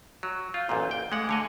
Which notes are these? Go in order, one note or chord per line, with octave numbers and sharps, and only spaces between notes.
F#3
F4 F5 G6
A1 F#2 A#2
G5
G#3 A3 F#5 G#5 D6
D3 C#5 D#5